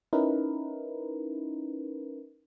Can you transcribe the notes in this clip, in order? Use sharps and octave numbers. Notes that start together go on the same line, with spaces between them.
C#4 D#4 E4 A#4 B4